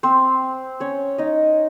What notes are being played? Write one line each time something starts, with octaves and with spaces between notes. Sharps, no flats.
C4 C5
C#4 C#5
D#4 D#5